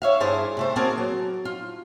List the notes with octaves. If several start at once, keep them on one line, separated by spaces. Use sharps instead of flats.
C#5 E5 F5
G2 D4 E4 G#4 C5 A5
C3 A3 C5
A#3 C4 F#4 G#4 A#4 A5
F#3
F4